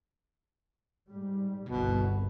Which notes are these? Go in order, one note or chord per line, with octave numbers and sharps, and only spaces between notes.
G#2 G3
G1 C2 B2